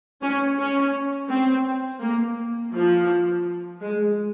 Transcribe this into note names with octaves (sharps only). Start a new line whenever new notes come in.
C#4
C#4
C4
A#3
F3
G#3